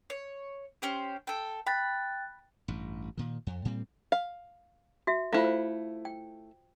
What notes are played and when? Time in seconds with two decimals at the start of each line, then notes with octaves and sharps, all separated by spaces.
0.10 C#5
0.82 C#4 G4 C5
1.27 A4 G5
1.67 G5 B5 F#6 A6
2.68 A1 G2
3.17 A#2 D#3
3.47 F2
3.65 A2 G3 C4
4.12 F5
5.07 F#4 E5
5.33 A3 E4 F4 C5 F5
5.44 C5
6.05 G5